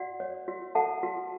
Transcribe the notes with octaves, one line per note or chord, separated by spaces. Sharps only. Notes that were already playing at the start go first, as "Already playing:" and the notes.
Already playing: F#4 D5 F#5
C#5
F#4
A4 F#5 A5
F#4